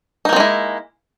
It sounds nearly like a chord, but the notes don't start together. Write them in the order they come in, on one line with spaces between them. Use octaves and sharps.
D#4 A#3 C4 G#3 E4